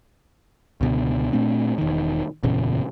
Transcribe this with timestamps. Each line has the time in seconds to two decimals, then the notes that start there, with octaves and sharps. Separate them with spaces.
0.81 C#2 B2 D3
1.33 A#2 A3 C4 D4
1.78 E1 D#3
2.43 F#1 E2 A#2 C#3